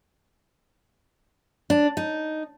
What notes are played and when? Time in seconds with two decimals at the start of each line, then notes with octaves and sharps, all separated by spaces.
1.70 D4
1.97 D#4